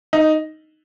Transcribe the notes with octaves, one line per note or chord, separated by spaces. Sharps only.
D#4